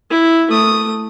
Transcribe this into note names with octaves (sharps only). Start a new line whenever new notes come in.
E4
A3 D#6